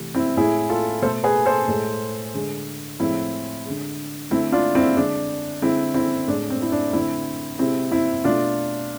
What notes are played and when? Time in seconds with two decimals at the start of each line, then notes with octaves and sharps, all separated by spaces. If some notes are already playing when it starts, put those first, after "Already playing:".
Already playing: C3 E3 A3
0.15 C4 E4
0.37 A2 G#3 E4 G#4
0.69 F4 A4
1.02 B2 A3 A4 C5
1.24 G#4 B4
1.46 A4 C5
1.68 A2 G#3
2.34 D3 G#3
3.00 A2 F3 G#3 C4 E4
3.65 D3 G#3
4.31 D3 A3 C4 E4
4.52 D4 F4
4.75 C4 E4
4.96 D3 G#3 D4
5.62 D3 G#3 C4 E4
5.94 C4 E4
6.27 A2 G#3 D4
6.50 C4
6.62 E4
6.72 D4
6.93 D3 A3 C4 E4
7.59 C3 G#3 C4 E4
7.92 C4 E4
8.24 B2 A3 D4 F4